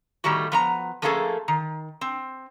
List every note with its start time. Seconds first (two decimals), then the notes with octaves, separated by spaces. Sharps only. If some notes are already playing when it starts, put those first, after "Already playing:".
0.24 A2 D#3 G3 A3 F#4
0.52 F3 B3 A#5
1.02 F3 A3 A#3 C#4 G#4 A4
1.48 D#3
2.01 C4